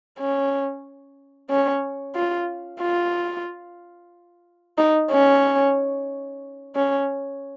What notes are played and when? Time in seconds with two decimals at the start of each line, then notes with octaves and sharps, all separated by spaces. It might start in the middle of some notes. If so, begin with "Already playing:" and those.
0.19 C#4
1.50 C#4
2.15 F4
2.81 F4
4.78 D#4
5.11 C#4
6.75 C#4